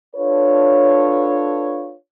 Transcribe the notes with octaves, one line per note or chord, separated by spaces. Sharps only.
D4 F4 A4 B4 C#5